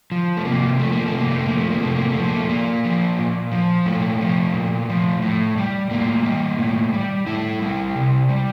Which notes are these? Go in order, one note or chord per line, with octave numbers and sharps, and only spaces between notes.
F3
A3
C3 A#3
F3 A3
A#3
A3
C3
A#3
A3
F3 A#3
A3
A#3
C3 A3
A#3
A3
F3
A#3
A3
A#2 A#3
F3
A#2
F3
A#2 A3
F3
A#2
F3
A2
G3
A2 A#3
G3
A2
G3
A2 E4
G3
C3
G3